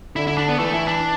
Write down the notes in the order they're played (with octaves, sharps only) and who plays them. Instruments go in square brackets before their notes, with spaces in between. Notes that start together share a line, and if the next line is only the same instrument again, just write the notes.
[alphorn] D3 [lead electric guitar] E4
[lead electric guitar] E4
D4
B3
[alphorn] E3 [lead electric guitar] A3
[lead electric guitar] E4
D4